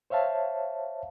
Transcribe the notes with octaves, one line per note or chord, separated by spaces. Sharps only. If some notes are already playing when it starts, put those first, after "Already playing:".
C5 C#5 E5 F5 A5